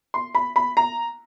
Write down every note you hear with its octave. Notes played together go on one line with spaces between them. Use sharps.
C6
B5
B5
A#5